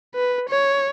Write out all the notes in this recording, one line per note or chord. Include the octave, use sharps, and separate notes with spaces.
B4
C#5